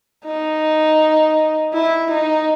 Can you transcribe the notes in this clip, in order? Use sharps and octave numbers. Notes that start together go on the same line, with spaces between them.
D#4
E4
D#4